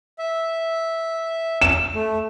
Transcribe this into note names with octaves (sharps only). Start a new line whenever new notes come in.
E5
E7
A3